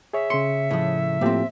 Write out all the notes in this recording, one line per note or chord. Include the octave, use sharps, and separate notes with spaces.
G#4 C#5 E5
C#3 C6 C#7
A2 F3
A2 F3 A#3 C4 G4